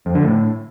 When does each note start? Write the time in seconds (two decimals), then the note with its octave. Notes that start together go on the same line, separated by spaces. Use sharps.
0.06 F2
0.15 D3
0.24 A2